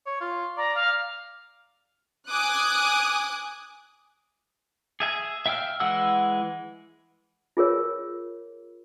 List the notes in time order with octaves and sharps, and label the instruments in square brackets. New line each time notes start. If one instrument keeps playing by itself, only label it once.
[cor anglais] C#5
F4
[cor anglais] D5 [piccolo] A#5
[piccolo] F5
[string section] G#5 D6 D#6 F#6
[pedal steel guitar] G#4 E5 G#5
E5 F5 G5 E6 F6
E3 G#3 F#5 E6
[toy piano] F4 G#4 A#4 C#5